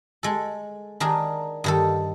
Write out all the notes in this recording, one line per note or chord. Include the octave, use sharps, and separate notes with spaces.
G#3 A4
D#3 D4 G#4 A#4
G2 D#3 A4